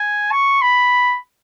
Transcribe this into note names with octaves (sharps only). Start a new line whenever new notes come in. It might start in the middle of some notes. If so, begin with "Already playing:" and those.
Already playing: G#5
C#6
B5